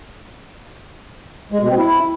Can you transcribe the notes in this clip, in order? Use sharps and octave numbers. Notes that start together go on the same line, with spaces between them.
G#3
B2
C4
E4